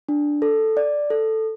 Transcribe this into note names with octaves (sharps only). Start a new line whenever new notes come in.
D4
A4
D5
A4